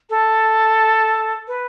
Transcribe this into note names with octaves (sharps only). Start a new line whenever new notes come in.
A4
B4